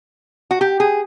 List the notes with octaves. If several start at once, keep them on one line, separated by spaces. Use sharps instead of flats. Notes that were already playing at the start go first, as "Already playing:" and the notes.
F#4
G4
G#4